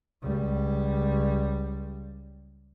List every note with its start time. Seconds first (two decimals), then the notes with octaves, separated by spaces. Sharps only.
0.23 C#2 G3